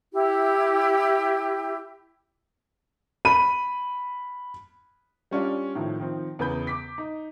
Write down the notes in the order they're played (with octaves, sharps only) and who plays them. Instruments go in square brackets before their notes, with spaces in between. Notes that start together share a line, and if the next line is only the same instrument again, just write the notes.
[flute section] E4 G4
[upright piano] B5 D#7
G3 C#4 D4 F4
A2 D#3 F3
D#3 F3 C4
E2 C#3 B3 B5 G6
D6 B6
D#4